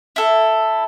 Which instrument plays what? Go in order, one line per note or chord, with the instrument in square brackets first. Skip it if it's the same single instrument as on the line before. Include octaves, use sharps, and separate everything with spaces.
[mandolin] E4 A4